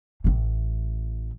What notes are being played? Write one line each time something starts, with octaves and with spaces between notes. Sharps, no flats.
A1 E3